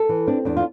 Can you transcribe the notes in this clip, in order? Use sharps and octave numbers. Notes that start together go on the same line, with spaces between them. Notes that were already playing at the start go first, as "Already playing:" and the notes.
Already playing: A4
E3
C4 D4
E2 D4
F4